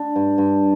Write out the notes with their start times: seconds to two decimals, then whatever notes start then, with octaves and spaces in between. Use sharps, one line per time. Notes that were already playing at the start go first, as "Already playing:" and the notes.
Already playing: D4
0.16 G2
0.38 G2